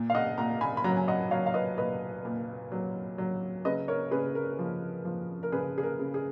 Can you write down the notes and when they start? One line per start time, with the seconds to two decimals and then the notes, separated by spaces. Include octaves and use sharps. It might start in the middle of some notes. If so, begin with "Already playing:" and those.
Already playing: A#2
0.10 F5
0.15 D#5 F#5
0.38 A#2 F#5 A#5
0.61 G#5 B5
0.77 B5
0.84 F#3 F#5 A#5
0.97 G#5
1.08 D#5 F#5
1.31 F#3 C#5 F5
1.46 F5
1.54 B4 D#5
1.78 A#2 B4 D#5
2.25 A#2
2.72 F#3
3.18 F#3
3.65 C#3 B4 D#5
3.88 A#4 C#5
4.11 C#3 G#4 B4
4.35 A#4
4.59 F3
5.05 F3
5.43 A#4
5.52 C#3 G#4 B4
5.78 G#4
5.83 A#4
5.99 C#3
6.14 G#4